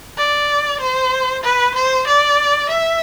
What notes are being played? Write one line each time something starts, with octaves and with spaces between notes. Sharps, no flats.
D5
C5
B4
C5
D5
E5